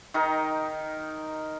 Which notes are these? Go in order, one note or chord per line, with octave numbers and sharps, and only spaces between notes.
D#3 D#4 A#4